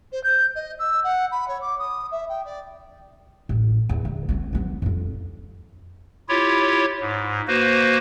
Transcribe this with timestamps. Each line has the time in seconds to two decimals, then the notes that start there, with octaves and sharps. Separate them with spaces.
0.12 C5
0.23 G6
0.55 D#5
0.79 E6
1.03 F#5
1.31 B5
1.48 C#5
1.61 D6
1.79 D#6
2.11 E5
2.29 G5
2.45 D5
3.49 A1
3.89 E2
4.05 D3
4.29 B3 C#4
4.53 F#3 B3
4.82 F2 F4
6.29 E4 F4 G4 C#5
7.00 G#2
7.48 A#3 F#4 B4 C5